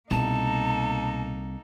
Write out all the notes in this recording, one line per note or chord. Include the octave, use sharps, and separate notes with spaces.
C2 B2 A#3 D#4 A4 A5